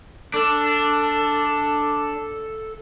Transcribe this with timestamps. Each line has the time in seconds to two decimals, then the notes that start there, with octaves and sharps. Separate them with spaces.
0.34 D4 A4